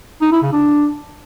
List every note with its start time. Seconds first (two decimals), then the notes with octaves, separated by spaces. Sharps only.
0.22 D#4
0.32 E4
0.42 C#3
0.53 D4